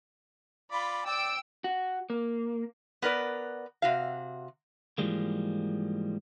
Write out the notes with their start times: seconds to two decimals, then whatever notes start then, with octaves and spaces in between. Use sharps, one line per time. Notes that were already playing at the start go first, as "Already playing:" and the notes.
0.72 F4 D5 B5
1.06 D5 G5 E6 D7
1.64 F#4
2.10 A#3
3.02 B3 A#4 B4 D5
3.82 C3 F#4 F5
4.98 G#2 E3 F3 G3 G#3 A#3